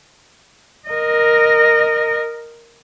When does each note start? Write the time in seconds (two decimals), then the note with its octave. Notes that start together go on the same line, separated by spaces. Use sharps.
0.88 A#4 D#5